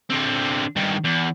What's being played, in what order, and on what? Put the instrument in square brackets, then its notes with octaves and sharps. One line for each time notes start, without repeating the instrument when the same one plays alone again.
[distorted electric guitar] D3 C4
G2 D#3
E2